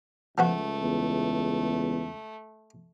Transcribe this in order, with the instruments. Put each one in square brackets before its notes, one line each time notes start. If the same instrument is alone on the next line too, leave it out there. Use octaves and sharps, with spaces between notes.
[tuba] C#2 [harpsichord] F3 B3 F#4 [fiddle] A3
[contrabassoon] E2